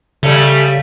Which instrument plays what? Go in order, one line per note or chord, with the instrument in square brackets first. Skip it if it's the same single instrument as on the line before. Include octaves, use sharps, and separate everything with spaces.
[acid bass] C#3 [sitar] G3 A3